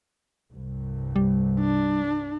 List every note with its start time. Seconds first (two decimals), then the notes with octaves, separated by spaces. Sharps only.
0.54 C2 G2
1.16 G3
1.60 D4